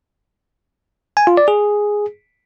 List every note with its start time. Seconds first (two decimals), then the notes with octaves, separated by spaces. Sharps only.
1.17 G#5
1.27 F4
1.37 D5
1.48 G#4